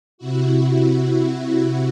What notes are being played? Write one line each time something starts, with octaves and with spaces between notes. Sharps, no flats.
C3 E4 F#4